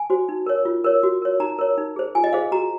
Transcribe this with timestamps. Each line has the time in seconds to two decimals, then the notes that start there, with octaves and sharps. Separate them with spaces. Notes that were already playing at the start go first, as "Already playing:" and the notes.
Already playing: G#5
0.10 F#4 C5
0.29 D#4
0.46 A#4 C#5
0.65 F4
0.84 A#4 C#5
1.03 F#4
1.22 A#4 C#5
1.40 D#4 A#5
1.59 A#4 C#5
1.78 D#4
1.96 G#4 C5
2.15 F4 G#5
2.24 D#5
2.33 G#4 C5 F5
2.52 F#4 A#5